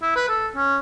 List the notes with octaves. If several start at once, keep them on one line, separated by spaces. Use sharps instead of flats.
E4
B4
A4
C#4